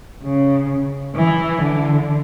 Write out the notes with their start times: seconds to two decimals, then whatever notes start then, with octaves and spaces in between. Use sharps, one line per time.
0.23 C#3
1.16 E3
1.62 D3